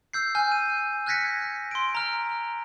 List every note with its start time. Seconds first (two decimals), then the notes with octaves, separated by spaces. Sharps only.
0.13 E6 G6 C7
0.35 G#5 F6 G6
0.52 D#7
1.06 F6 F#6 G#6 A#6 B6 C#7
1.71 C6 D7
1.95 A#5 F6